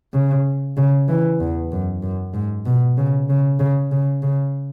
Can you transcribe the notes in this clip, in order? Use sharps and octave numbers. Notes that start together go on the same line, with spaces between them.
C#3
C#3
E3
E2
F#2
F#2
G#2
B2
C#3
C#3
C#3
C#3
C#3